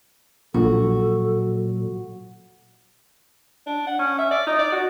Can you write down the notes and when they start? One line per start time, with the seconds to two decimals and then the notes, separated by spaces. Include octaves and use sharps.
0.54 A#1 A#2 F#3 F#4 A4
3.67 D4
3.87 F#5
3.99 C#4
4.19 E5
4.31 D5
4.47 D#4
4.59 D5
4.72 F#4